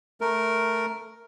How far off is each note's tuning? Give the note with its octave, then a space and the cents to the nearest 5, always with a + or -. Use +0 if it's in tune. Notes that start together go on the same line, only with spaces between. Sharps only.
A3 +0 A#4 +0